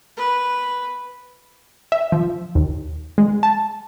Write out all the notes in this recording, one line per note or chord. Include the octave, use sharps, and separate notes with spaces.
B4
E5
F3
D#2
G#3
A5